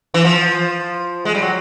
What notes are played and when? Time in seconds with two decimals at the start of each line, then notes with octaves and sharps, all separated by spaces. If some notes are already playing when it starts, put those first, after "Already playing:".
0.14 E3
0.25 F3
1.25 G#3
1.35 G3
1.42 F#3